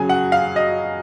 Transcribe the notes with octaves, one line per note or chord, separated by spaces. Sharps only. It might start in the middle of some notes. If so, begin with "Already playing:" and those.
Already playing: C#3 F#3 G#5
F#5
F5
D#5